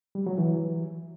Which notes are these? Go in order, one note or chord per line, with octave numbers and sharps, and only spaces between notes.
G3
F#3
E3